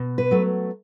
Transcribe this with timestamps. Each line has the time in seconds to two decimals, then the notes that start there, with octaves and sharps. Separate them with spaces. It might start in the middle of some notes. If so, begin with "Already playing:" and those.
Already playing: B2
0.18 B4
0.31 F#3 A3